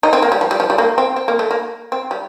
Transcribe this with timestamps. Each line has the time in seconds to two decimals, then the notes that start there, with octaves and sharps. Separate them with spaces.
0.03 D#4
0.13 C4
0.22 A#3
0.32 G3
0.41 F3
0.51 G3
0.60 F3
0.70 G3
0.78 A#3
0.98 C4
1.16 C4
1.28 A#3
1.39 A3
1.51 A#3
1.92 C4
2.11 G3